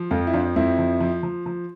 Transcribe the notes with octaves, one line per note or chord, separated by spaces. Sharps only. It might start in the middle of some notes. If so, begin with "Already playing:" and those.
Already playing: F3
F2 F4 A4
E4
F3 D4 F4
F2 C4 E4
F3
F3
F3
F3